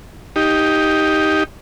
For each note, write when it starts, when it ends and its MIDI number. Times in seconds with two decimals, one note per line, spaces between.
0.36 1.43 63
0.36 1.43 67